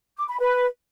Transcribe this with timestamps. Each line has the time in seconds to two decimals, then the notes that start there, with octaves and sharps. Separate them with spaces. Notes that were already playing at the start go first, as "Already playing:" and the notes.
0.17 D6
0.28 B5
0.39 B4